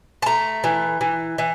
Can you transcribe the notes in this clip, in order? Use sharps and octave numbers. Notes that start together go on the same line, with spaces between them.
A5
A3 A#5
E3
E3
E3